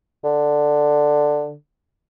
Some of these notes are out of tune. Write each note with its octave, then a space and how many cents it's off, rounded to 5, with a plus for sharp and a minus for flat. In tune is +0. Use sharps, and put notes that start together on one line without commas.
D3 +5